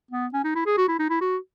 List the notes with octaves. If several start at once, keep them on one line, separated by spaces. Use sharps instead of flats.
B3
C#4
D#4
E4
G#4
F#4
E4
D#4
E4
F#4